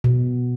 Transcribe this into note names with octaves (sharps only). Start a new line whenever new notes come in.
B2